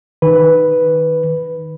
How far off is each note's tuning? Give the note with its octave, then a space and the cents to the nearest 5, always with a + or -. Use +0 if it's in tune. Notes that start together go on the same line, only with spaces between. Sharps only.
D#3 +0 B4 +0